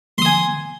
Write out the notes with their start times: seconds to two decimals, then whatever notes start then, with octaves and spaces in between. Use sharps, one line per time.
0.18 C6
0.22 D#6
0.25 G#5